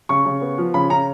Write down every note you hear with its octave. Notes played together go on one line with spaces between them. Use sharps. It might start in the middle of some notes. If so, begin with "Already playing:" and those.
C#3 C#6
C#3
B3
F3
C#3 B5
C#3 A#5